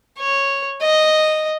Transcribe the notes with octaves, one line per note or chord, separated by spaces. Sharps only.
C#5
D#5